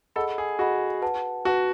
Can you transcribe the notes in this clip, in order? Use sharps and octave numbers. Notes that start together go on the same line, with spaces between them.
G#4 A4 D#5 F#5 B5
G#4
F#4 G#4 D#5 F#5 B5
B4 F#5 A5
F#4 B4 F#5 A5